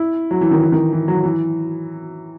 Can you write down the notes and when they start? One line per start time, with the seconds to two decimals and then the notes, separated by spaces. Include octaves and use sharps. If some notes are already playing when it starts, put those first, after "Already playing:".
Already playing: E4
0.31 F#3
0.41 E3
0.51 D#3
0.62 E3
0.72 D#3
0.92 E3
1.08 F#3
1.23 E3